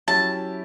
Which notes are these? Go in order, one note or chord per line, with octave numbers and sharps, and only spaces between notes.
F#3 C#4 E4 G4 A5